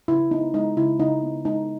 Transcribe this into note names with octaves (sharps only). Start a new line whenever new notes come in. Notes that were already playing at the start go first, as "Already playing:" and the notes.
C#3 E4
B3 D#4
G#3 D#4
C#3 E4
C#3 D#4
B3
G#3 D#4